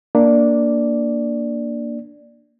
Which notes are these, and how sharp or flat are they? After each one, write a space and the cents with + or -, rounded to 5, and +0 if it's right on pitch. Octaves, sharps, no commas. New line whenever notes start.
A#3 +0 D4 +0 D5 +0